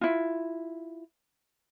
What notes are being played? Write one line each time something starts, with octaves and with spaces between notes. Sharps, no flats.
E4 F4